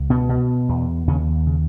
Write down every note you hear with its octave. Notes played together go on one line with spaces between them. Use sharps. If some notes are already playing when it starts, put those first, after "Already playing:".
Already playing: C#2
B2 B3
B2
E2
D#2 C#3 C#4
C#3